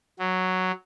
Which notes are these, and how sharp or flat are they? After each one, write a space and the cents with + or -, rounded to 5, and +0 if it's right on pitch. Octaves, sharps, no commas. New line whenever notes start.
F#3 +0